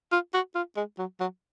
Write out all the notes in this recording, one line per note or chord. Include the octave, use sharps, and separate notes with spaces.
F4
F#4
F4
G#3
F#3
F#3